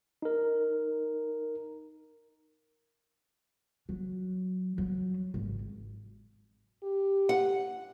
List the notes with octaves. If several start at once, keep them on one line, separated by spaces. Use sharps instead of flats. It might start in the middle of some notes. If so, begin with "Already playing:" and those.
D#4 A#4
F#3
F#3
G#1
G4
F#5